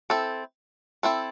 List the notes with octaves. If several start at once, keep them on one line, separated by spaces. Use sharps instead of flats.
C4 E4 A4
C4 E4 A4